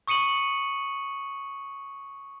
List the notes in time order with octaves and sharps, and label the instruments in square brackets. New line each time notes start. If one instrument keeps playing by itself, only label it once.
[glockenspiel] C#6 D#6 C#7 D#7 F#7